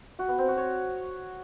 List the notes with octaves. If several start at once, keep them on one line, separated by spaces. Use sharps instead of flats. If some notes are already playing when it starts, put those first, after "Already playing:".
F#4
B3
C4
F#4
C#5